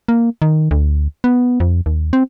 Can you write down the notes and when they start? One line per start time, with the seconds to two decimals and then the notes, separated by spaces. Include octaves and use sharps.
0.08 A#3
0.42 D#3
0.71 D2
1.24 B3
1.60 F2
1.86 D#2
2.13 C4